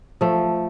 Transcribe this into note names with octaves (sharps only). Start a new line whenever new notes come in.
F3 A3